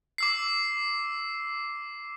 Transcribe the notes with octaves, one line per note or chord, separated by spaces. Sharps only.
D6 E6 C7